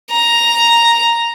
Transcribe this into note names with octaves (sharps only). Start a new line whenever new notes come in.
A#5